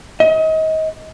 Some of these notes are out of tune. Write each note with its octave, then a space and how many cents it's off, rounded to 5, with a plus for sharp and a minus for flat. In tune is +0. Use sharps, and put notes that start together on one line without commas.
D#5 +30